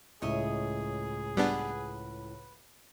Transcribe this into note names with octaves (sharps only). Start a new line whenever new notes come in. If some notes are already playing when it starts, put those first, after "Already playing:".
C#2 A2 G#4 C#5 D#5 E5
G3 B3 D4 B4 F#5